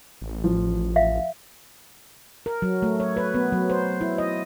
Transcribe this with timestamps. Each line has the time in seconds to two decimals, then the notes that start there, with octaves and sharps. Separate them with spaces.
0.22 A1
0.44 F3
0.96 E5 F5
2.46 A#4
2.62 F#3
2.82 A3
3.00 C#5
3.17 B4
3.35 B3
3.52 F#3
3.70 C5
4.01 E4
4.18 D#5